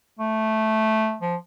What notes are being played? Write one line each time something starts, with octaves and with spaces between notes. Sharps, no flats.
A3
F3